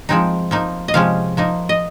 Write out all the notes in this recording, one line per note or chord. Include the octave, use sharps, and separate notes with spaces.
F3 G#3 C4 D#4
F3 A#3 D#4
D#5
C3 F3 G#3 C#4 F5
F3 A#3 D#4
D#5